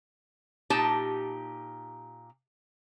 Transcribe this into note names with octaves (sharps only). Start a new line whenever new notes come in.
A#2 D#4 G4 A5